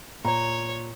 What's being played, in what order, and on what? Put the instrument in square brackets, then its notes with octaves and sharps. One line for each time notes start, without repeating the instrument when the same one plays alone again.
[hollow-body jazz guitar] A#2 [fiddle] C#5 [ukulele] A#5